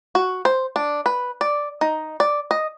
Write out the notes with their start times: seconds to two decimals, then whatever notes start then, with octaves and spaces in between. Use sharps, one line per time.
0.15 F#4
0.45 C5
0.76 D4
1.06 B4
1.41 D5
1.81 D#4
2.20 D5
2.51 D#5